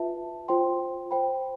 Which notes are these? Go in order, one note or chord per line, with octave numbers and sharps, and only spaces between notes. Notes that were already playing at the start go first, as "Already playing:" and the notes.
Already playing: F4 B4 E5 A5
F4 C5 G5 C6
C5 G5 B5